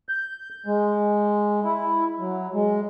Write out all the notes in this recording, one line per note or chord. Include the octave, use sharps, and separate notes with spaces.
G6
G#3
E4
F#3
G#3